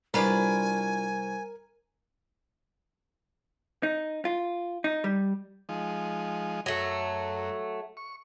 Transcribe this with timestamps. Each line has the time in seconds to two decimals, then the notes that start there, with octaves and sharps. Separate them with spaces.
0.14 C2 D4 F4 A#4 B4 G#5 D6
3.83 D#4
4.25 F4
4.84 D#4
5.04 G3
5.69 F3 G#3 D#4
6.66 F#2 F#3 A3
7.97 C#6